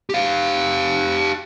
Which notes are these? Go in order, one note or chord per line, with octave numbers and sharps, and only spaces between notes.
G4 F5